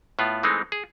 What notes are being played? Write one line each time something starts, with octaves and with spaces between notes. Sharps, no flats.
A2 B3 F4
E3 G#3 A3 C4 D#4
G#4